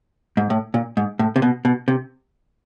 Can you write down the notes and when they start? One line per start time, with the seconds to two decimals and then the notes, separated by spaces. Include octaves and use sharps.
0.37 G#2
0.50 A2
0.74 A#2
0.97 G#2
1.19 A2
1.36 C3
1.42 B2
1.65 B2
1.88 C3